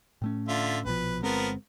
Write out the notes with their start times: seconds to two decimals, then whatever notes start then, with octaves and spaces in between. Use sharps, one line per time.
0.22 A2 A3 C#4
0.48 D3 F4 E5
0.86 A#1 B2 F3 B4
1.23 G1 F3 G#3 B3 C4 A#4